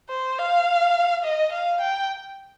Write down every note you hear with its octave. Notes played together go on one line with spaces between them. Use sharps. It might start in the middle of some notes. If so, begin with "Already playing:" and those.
C5
F5
D#5
F5
G5